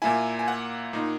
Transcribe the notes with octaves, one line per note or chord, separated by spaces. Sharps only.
A#2 A#3 E4 G#5
G#5
F#5
A#2 A#3 D#4